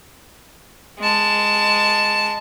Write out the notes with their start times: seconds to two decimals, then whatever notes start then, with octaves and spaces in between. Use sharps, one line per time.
0.99 G#3 A5